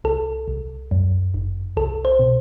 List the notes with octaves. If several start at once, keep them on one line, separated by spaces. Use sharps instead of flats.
C2 A4
C2
F#2
G1
C2 A4
C5
B2